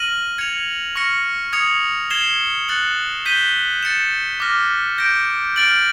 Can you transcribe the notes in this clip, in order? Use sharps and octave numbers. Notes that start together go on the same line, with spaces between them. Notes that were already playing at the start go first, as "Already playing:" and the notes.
Already playing: F6 A#6 D#7 F#7
G#6 C#7 F7
C#6 F6 A#6 C#7
D#6 G#6 C#7 F7
G#6 C7 E7 G7
F#6 A6 C#7 F#7
G6 B6 D#7 G7
A6 C#7 E7
D6 F6 A#6
G6 A#6 D7
F6 A6 D7 F#7